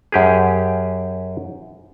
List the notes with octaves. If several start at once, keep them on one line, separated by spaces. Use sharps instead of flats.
F#2 G4 G#4